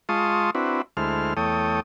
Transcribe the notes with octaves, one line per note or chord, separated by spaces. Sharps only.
G#3 F4 A5 C6 C#6 D#6
C4 D4 E4 F#4 B4
D2 G#3 E4 A4 C5 F6
E2 A3 A4 C#5 G5 D#6